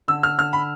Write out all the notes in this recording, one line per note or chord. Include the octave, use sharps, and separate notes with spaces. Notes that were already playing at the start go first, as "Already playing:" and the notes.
D3 E6
F6
D3 F6
B5